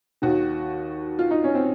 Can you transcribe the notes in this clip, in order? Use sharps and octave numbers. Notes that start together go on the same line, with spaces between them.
D#2 D#3 F#4
F4
D#4
C#4
C4